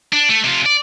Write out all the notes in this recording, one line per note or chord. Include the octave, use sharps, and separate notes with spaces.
D4
A3
C3 F4
D5